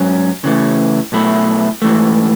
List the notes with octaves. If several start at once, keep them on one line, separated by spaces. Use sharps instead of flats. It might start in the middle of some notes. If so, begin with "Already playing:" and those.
Already playing: G#2 F#3 C#4
C#3 E3 A3
B1 B2 A3 E4
G#2 E3 A3